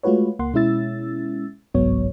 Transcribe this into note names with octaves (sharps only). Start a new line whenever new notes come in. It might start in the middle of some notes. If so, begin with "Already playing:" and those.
G#3 A3 F4 F#4 B4 C#5
C#2 A#3 F#5 C6
B2 G#3 C#4 E4 E6 A6
G1 C2 G#2 F#3 B3 C#5